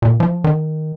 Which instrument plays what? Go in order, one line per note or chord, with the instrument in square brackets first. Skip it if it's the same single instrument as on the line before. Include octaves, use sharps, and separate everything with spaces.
[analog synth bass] A#2
F3
D#3